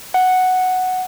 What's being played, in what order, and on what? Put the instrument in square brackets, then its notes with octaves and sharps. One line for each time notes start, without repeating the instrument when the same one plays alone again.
[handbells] F#5